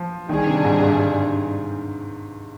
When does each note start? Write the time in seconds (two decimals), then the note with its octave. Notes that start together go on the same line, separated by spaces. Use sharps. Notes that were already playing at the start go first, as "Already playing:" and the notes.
Already playing: F3
0.29 D3 D#3 G3 D4 G#4
0.47 C3
0.65 G#2
0.82 G2